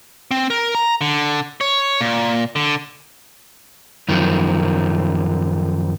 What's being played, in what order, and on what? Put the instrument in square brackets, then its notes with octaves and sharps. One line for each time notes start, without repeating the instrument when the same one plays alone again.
[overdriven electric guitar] C4
A#4
A#5
D3
C#5
A#2
D3
[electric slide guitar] F#2 D#3 F3